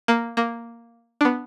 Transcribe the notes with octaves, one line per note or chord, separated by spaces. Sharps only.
A#3
A#3
D4
B3